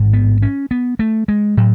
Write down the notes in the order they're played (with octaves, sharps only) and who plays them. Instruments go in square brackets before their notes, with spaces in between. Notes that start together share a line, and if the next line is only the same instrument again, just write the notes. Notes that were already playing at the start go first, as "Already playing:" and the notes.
Already playing: [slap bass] A1 G#2
B3
C#4
B3
A3
G#3
A2 F#3